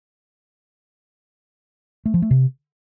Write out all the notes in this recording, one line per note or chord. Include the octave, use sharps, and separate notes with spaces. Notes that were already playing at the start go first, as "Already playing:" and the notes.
A3
F3
A3
C3